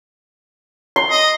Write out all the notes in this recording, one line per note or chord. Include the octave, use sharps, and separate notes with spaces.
C6
D#5